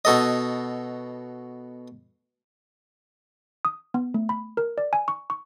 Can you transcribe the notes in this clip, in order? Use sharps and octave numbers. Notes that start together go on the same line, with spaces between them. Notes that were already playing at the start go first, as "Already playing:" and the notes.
B2 A4 D#5
D#6
B3
A3
B5
A#4
D5
G#5
C#6
C#6